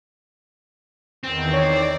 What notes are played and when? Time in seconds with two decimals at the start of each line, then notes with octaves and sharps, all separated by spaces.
1.24 E2 D#3 C4
1.53 C#5 D5